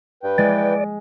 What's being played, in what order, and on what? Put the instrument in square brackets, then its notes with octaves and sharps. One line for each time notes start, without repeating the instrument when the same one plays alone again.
[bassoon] G2 [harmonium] B4 G5
[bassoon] E3 [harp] G#3 [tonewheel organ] D5